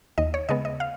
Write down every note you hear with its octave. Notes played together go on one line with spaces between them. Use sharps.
D#2 D#5
C#5
C#3 G#3 B3 D#5
D#5
F5